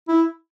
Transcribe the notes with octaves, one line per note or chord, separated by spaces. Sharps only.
E4